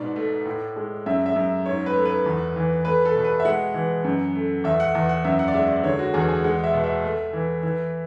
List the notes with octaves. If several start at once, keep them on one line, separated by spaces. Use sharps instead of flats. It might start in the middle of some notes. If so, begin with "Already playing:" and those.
Already playing: G#2 B2 D5
A3
A2
G#3
F#2 E5
E5
F#2
G#2 C#5
B4
A3
B4
E2
E3
A3 B4
A4
B2
B4
E5
G#3 F#5
E3
F#2
A3
E2 E5
F#5
E2
F#5
F#2 E5
F#5
D5
G#3 E5
D5
D3 C#5
F#4
E2 G#4
G#4
G#3 F#5
E5
B2
E5
A3
E3
E3